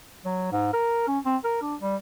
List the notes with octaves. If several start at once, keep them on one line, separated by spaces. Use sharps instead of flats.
F#3
G#2
A#4
C#4
C4
A#4
D4
G3